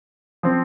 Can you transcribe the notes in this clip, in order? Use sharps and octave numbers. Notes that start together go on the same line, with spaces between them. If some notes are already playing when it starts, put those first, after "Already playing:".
F3 C4